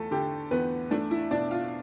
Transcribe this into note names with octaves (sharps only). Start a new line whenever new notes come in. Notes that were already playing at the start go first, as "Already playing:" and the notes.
Already playing: E2 A3 A4
D3 G4
E2 B3 B4
A3 D4 D5
E4 E5
B2 D4 D5
F4 F5